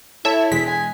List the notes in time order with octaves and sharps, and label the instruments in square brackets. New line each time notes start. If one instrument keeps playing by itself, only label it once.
[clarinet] E4 [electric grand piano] A4 C#5 A5 [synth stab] E5
[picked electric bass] E1 [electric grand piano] G#3 [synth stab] B6
[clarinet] G#5